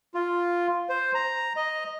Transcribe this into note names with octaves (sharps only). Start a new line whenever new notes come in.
F4
C5
A#5
D#5